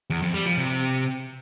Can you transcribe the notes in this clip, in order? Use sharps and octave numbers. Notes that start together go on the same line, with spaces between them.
E2
F2
G3
F3
C3